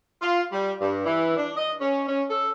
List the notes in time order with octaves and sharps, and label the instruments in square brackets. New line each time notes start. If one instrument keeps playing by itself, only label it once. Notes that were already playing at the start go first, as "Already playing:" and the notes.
[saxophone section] F4
G3
G2
E3
D4
D#5
C#4
C#4
A4